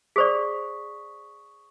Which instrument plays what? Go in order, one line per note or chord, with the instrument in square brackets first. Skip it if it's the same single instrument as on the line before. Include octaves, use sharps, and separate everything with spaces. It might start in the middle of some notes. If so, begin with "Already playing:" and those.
[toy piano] G#4 C5 D5 [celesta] C#6 D#6 B6